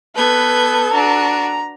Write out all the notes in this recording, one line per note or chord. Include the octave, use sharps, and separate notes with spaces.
B3 A4 B4 G6 G#6
D4 F#4 A#5